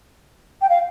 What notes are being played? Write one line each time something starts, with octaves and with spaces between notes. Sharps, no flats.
G5
F5